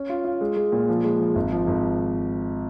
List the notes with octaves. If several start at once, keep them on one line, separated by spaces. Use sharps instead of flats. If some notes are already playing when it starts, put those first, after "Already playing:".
Already playing: C#4
F4
F4
G#3
G#3
A#2
F3
G#3
F3
G#1
F3
G#1